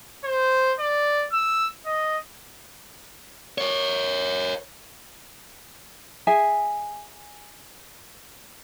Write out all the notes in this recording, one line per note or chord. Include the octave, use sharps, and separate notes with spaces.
C5
D5
E6
D#5
A#4 C#5
G#4 E5 G#5